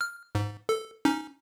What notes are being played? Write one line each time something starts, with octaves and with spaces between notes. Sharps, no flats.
F6
G#2
A4
C#4 D#4